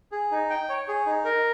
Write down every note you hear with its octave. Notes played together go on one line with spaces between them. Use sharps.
G#4
D#4
G5
C#5
G#4
D#4
A#4